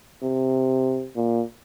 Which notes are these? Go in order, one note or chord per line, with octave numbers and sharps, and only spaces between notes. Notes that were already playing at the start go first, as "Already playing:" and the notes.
C3
A#2